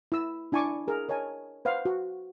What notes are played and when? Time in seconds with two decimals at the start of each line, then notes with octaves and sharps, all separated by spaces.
0.12 E4 E6
0.52 D4 E4 G#5 A5 C#6 D6
0.88 G#4 A#4
1.09 A#4 C#5 D#5 G#5 A5
1.65 B4 C5 F5 F#5
1.85 F#4